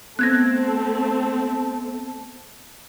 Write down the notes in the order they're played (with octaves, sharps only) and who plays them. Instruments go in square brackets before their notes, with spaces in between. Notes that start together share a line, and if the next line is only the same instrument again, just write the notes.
[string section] A3 C4 [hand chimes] B3 [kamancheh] A4 A5 [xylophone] F#6 G#6 A#6